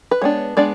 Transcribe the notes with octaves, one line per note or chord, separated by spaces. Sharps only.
B4
G#3 B3 D4 C#5
G#3 B3 D4 D5